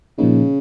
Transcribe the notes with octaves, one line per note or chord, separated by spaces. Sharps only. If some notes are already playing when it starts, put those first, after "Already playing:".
A#2 C#3 F3 A#3 D#4